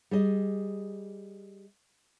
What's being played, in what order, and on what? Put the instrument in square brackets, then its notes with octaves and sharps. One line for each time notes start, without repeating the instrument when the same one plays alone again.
[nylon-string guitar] G3 G#4 D#5